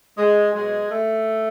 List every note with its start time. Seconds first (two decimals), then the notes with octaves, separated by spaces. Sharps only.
0.17 G#3
0.54 B2 F#3 G#3
0.90 A3